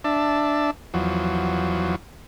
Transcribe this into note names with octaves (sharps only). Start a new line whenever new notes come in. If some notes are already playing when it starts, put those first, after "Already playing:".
D4 E5 A5
E2 F3 F#3